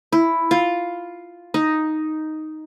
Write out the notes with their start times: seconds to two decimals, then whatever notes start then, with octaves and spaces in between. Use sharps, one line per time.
0.12 E4
0.51 F4
1.54 D#4